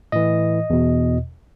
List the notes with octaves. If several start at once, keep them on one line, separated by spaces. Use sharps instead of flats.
A2 E3 D#5
E2 B2